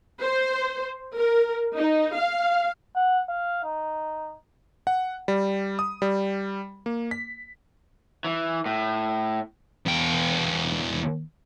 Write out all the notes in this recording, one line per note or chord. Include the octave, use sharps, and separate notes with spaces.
C5
A#4
D#4
F5
F#5
F5
D#4
F#5
G3
D#6
G3
A#3
B6
E3
A2
E2 G5